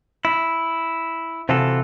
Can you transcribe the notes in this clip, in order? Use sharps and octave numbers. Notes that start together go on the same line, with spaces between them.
E4
C3 E3 F4 F#4 A4